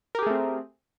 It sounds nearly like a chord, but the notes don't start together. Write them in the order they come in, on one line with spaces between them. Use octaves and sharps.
A#4 G4 G#4 A3 C4